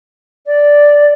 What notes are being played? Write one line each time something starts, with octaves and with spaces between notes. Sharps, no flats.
D5